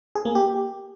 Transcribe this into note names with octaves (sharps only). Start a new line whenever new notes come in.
G#4
A#3
G4